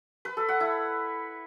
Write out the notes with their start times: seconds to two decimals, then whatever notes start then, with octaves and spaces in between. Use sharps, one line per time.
0.25 B4
0.37 A4
0.49 F#5
0.60 E4